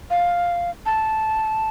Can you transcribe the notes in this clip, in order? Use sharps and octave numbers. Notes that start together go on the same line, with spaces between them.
F5
A5